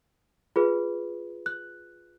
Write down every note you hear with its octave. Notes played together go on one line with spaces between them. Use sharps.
F4 G#4 B4
F#6